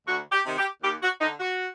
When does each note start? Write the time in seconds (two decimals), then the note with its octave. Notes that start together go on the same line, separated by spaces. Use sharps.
0.07 D2 F#4
0.32 G4
0.44 C3 D#3
0.58 G4
0.83 D#2 G4
1.02 F#4
1.21 D3 D#4
1.39 F#4